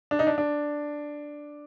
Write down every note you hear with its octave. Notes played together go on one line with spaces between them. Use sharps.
D4
D#4
D4
D4